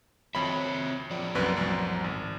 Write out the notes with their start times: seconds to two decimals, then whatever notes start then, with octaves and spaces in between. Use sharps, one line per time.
0.35 F2 C4 C#5 E5 B5
1.11 F3 D5
1.35 C2 F#2 B4
1.57 C2 F#2
2.04 G#1